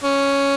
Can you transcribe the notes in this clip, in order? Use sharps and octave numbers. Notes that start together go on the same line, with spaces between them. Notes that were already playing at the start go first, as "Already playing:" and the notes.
C#4